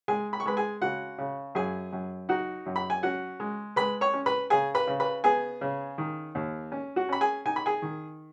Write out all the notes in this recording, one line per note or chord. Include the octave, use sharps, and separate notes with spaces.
G#3 G#4 G#5
B5
C#6
G#3 B4 B5
G#4 G#5
C#3 F#4 F#5
C#3
F#2 G#4 G#5
F#2
D#4 F#4 F#5
F#2
B5
G#5
C#4 F#4 F#5
G#3
G#3 B4 B5
C#5 C#6
C#4
B4 B5
C#3 G#4 G#5
B4 B5
C#3
B4 B5
B3 G#4 G#5
C#3
D#3
D#2
C#4
F#4 F#5
C#4 B5
G#4 G#5
D#4 G#5
B5
G#4 G#5
D#3